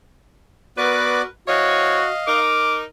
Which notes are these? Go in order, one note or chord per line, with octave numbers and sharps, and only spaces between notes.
B3 F#4 A#4 B4 D5 D6
E3 C4 F#4 C#5 D#5 F5
D#4 A#4 D6